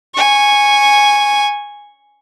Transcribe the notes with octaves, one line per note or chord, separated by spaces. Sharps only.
G#5 C#6